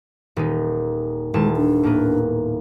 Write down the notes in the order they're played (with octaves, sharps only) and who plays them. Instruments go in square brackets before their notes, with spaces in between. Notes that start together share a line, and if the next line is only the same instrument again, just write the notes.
[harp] D#1 D#4
[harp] D#1 E4 A5 [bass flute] G#3
[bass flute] D4
[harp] A2 A#3 B3